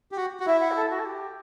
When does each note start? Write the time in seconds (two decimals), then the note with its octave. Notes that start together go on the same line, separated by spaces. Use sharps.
0.12 G4
0.17 F#4
0.40 F#4
0.46 E4 E5
0.61 F#5
0.71 G4
0.76 A4
0.91 F#4
1.00 A4
1.05 G4